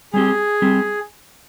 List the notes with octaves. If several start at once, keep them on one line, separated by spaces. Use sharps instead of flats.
G3 C4 G4 G#4
G3 C4 G4